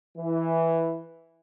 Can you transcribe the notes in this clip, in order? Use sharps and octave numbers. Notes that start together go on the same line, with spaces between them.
E3